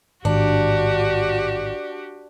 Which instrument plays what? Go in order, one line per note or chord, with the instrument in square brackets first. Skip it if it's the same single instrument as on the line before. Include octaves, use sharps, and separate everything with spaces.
[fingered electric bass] A1 G#2 D#3 [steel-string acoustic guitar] D4 [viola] F#4 G4